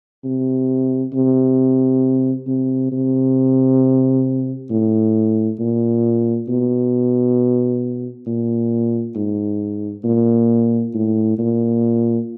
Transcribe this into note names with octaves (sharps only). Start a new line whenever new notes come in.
C3
C3
C3
C3
A2
A#2
B2
A#2
G#2
A#2
A2
A#2